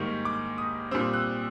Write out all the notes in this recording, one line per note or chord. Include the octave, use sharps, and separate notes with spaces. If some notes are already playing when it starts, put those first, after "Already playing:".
Already playing: G#2 D#3 G3 A#3 C#6
D6
D#6
A#2 G3 C4 E6
F#6